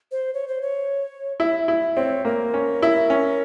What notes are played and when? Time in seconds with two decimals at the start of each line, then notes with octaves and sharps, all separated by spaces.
0.12 C5
0.34 C#5
0.48 C5
0.62 C#5
1.40 E4 E5
1.68 E4
1.97 C4 C#5
2.25 A#3 A#4
2.54 C#4
2.82 E4
3.10 C#4